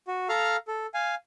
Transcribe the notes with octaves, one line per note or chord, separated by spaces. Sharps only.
F#4
A4 F5 A#5 F6
A4
F5 G#5